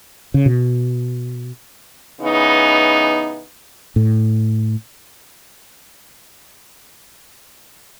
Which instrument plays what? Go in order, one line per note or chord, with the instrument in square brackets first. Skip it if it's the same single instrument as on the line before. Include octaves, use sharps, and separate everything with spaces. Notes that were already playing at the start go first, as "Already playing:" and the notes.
[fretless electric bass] C#3
B2
[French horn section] C#3 E3 B3 D#4
[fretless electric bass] A2